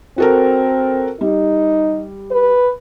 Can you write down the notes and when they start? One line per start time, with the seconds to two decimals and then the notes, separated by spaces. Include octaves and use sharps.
0.18 C4 F#4 A4 A#4
1.21 G3 D#4
2.31 B4